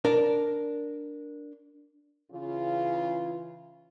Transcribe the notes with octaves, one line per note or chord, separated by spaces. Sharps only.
D4 A#4 D5
C#3 E3 F4